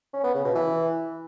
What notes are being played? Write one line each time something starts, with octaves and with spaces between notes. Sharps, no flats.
C#4
B3
C#3
B2
E3